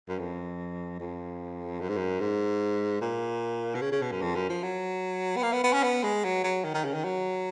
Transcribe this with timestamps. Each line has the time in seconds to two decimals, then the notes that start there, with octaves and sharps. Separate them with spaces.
0.09 F#2
0.19 F2
1.00 F2
1.80 F#2
1.89 G#2
1.97 F#2
2.20 G#2
3.01 A#2
3.75 B2
3.81 C#3
3.92 C#3
4.02 B2
4.11 F#2
4.22 F2
4.35 F#2
4.49 F3
4.63 F#3
5.37 B3
5.43 A#3
5.53 B3
5.64 B3
5.73 C#4
5.83 B3
6.03 G#3
6.24 F#3
6.44 F#3
6.64 D#3
6.74 D#3
6.84 C#3
6.94 D#3
7.04 F#3